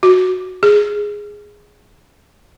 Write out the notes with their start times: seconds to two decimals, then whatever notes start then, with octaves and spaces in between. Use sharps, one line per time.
0.03 F#4
0.63 G#4